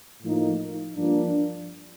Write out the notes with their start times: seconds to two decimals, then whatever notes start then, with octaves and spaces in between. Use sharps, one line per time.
0.23 A2 F3 A#3 D#4
0.96 G2 F3 A#3 D4